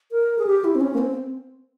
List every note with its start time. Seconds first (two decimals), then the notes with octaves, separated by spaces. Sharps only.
0.11 A#4
0.39 G#4
0.47 G4
0.64 E4
0.75 C4
0.81 C#4
0.94 A#3
0.98 C4